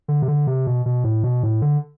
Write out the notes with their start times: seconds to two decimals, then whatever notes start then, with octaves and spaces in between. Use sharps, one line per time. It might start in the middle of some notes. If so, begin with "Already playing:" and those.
0.08 D3
0.22 C3
0.28 D3
0.47 C3
0.67 B2
0.86 B2
1.04 A2
1.23 B2
1.43 A2
1.62 D3